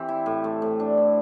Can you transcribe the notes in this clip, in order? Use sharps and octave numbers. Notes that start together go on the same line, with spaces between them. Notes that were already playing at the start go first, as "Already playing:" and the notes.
Already playing: E3 C4 G4
E4
A2
A3
A2
D4
E4